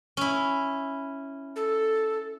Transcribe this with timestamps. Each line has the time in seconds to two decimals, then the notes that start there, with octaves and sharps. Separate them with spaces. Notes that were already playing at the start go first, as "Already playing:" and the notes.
0.17 C#4 E4
1.56 A4